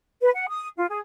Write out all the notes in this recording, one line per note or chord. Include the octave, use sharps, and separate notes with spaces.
B4
F#5
D#6
F4
G#4